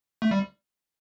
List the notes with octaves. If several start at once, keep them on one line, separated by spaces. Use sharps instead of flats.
A3
G3